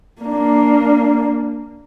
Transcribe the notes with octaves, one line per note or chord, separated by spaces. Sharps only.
A#3 D4